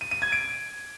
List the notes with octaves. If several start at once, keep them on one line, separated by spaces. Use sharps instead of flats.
D#7
D#7
G#6
D7